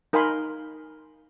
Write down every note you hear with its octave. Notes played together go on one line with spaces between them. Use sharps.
D#4 A#4 F5 G#5 B5 C6